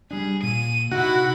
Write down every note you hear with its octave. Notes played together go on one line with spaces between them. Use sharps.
G3 D4 G#4
A#2 D#7
C3 D#4 E4 F#4 B5